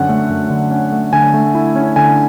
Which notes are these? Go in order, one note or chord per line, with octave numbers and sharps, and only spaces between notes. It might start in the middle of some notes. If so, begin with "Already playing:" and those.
Already playing: F#2 D3 C#4 F#5
A3
F#2
D3
C#4
A3
D3 G#5
A3
E4
C#4
D3 G#5